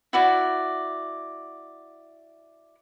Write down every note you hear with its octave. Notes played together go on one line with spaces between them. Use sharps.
E4 F#4 D5